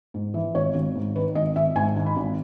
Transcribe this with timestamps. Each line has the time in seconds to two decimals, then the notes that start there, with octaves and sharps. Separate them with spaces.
0.14 G#2
0.34 E3
0.54 G#1 C#5
0.75 G#1
0.95 G#2
1.16 D#3 B4
1.35 G#1 D#5
1.56 G#1 E5
1.76 G#2 G#5
1.96 D#3
2.06 B5
2.16 G#1